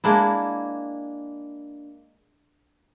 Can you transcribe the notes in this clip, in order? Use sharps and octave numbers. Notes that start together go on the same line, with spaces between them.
G#3 A#3 D4 E4